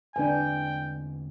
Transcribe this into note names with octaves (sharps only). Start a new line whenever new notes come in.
E2 D3 C4 D4 B4 G5 G#5